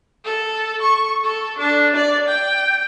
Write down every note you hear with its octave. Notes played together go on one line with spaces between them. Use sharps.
A4
C#6
A4
D4
D5
G5